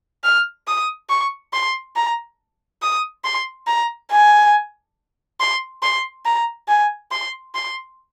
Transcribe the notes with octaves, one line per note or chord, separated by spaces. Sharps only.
F6
D#6
C#6
C6
A#5
D#6
C6
A#5
G#5
C6
C6
A#5
G#5
C6
C6